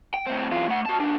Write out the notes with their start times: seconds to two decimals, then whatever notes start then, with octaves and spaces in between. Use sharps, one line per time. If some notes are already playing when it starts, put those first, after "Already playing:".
0.14 G5
0.27 A2 C4
0.51 E2 F4
0.68 A3 F#5
0.86 F#4 A5
0.99 D#2 D4